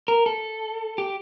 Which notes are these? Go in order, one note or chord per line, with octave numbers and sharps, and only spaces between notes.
A#4
A4
G4